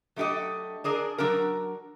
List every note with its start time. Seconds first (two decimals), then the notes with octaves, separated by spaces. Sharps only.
0.16 F#3 A3 D4 G4 A4 D#5
0.84 D4 G#4 A#4 D5
1.18 F#3 D4 F#4 A#4